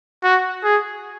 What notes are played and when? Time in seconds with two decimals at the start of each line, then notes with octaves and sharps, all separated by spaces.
0.24 F#4
0.64 G#4